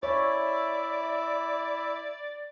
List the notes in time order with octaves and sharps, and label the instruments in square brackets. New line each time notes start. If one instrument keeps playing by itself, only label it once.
[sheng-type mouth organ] E4 E5 [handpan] C#5 [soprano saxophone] D5